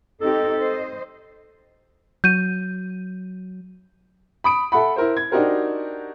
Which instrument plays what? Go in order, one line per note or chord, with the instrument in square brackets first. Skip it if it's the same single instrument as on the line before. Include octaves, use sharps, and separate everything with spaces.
[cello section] C4 D#4 G4 [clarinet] A4
[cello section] C5 D#5
[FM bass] F#3 [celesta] G6 D#7
[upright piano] B5 D#6 D7
A4 E5 F#5 B5
E4 A#4 C5
G#6
D4 D#4 F#4 G4 A#4 C5